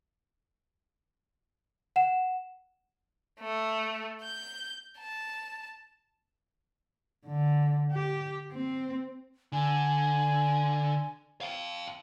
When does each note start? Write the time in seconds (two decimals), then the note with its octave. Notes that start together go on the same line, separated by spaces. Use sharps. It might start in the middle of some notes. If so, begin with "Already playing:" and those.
1.96 F#5 E7
3.40 A3
4.23 G6
4.98 A5
7.27 D3
7.92 G4
8.52 C4
9.52 D3 G#5
11.41 F5 G5